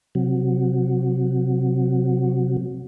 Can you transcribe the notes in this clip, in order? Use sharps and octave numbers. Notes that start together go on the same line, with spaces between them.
C3 F#3